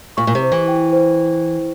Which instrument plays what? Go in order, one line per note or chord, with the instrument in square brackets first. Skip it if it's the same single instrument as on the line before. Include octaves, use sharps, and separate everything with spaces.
[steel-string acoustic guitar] A#2 [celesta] C#6
[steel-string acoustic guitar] A#2
C3
[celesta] C5
[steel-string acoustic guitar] E3
[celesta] G5
C5